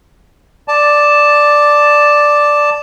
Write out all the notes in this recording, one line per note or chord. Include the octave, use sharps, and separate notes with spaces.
D5 A5